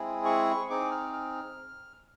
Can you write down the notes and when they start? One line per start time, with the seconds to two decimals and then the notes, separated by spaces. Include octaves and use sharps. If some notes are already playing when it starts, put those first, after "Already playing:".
Already playing: G#3 C4 E4 G#4
0.25 C#6
0.70 C4 D#4 G#4 D6
0.91 F6
1.13 F6